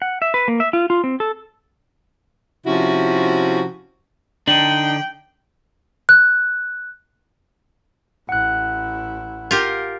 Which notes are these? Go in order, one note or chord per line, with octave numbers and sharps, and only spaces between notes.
F#5
E5
B4
A#3
E5
F4
F4
C4
A4
C3 F3 C#4 E4 F#4
D3 D4 D#4 G5 F#7
F#6
A1 E4 F#5 F#6
F4 G4 A#4